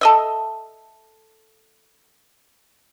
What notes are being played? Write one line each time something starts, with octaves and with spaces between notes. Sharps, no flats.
A4 D#5 E5